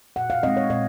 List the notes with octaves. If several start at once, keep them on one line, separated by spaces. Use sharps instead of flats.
A#2 F#5
F5
G#3 C4 D#5
C#5
A#2 D#5